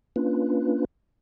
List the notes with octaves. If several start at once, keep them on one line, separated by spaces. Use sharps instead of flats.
A#3 C#4 D4 F4 B4